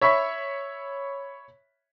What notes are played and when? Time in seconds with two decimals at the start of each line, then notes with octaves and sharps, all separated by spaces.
0.01 C#5 E5 B5 C#6 B6